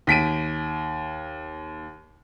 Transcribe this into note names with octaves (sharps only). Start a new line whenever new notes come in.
D#2 B6 D7 D#7